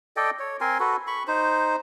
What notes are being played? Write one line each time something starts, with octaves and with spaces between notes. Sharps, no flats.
A4 D5 D#5 G5
C#5
C4 A#4 G#5 C6
F#4 A4 B4
B5 C#6
D#4 C5